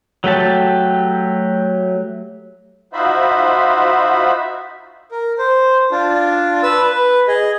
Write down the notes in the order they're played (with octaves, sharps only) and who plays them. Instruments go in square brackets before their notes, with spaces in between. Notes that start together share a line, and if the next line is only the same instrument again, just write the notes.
[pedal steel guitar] F#3 A3 G4 A5
[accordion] D#4 F4 F#4 C5 E5 B5
[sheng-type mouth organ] A#4
C5
D4 F4
B4 E6
B4
G#4 D#5